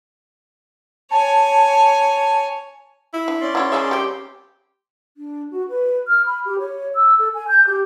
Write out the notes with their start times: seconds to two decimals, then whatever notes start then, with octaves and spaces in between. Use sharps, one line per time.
1.11 C#5 G#5 A5
3.13 E4
3.28 D4
3.41 C#4 D5 C6
3.55 E4 F#4 C#5
3.72 G#3 D#4 G#4 E5
3.91 G3 C4 G4
5.17 D4
5.51 F#4
5.69 B4
6.08 F6
6.26 B5
6.45 G4
6.59 C#5
6.95 E6
7.19 A4
7.34 G#5
7.48 G6
7.67 G4